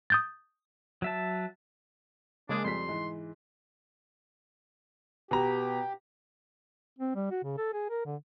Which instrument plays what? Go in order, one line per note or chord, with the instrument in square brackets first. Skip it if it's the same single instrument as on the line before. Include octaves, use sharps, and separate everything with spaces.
[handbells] D#6 G6 A6
[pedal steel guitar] F#3 E5 A5
[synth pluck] C#3 G#3 G#4 [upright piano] A#3 [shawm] D4
[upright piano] F2 G3 B6 [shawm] C6
[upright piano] G#2 E3
[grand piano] B2 A#5 [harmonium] G4
[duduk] C4
G3
F#4
C#3
A4
G#4
A#4
D3